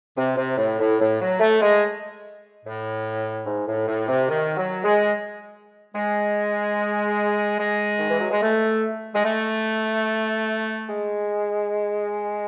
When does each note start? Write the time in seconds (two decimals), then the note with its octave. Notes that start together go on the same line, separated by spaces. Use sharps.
0.17 C3
0.37 C3
0.57 A2
0.79 A2
0.99 A2
1.20 F#3
1.40 A3
1.61 G#3
2.64 A2
3.46 G#2
3.67 A2
3.87 A2
4.08 C3
4.28 D#3
4.57 F#3
4.83 G#3
5.94 G#3
7.58 G#3
7.98 D#3
8.09 E3
8.20 F#3
8.30 G#3
8.41 A3
9.15 G#3
9.24 A3
10.88 G#3